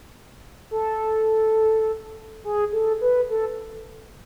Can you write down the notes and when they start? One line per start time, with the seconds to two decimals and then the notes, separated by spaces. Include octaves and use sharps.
0.71 A4
2.44 G#4
2.72 A4
3.01 B4
3.30 A4